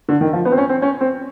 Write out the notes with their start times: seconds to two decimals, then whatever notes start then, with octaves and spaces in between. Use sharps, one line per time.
0.09 D3
0.21 D#3
0.33 F3
0.45 B3
0.52 C4
0.58 C#4
0.69 C4
0.82 C#4
1.00 C4